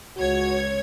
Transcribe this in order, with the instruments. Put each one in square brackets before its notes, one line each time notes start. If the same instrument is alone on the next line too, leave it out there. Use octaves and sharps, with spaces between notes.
[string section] C#2 C#5 G#6 [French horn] F#4